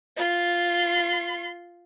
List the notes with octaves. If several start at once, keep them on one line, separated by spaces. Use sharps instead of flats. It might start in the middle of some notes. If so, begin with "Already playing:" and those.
F4 C6